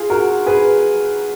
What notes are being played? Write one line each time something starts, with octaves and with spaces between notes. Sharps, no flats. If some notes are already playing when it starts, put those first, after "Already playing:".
Already playing: F4 G#4
F#4 A#4
G#4 B4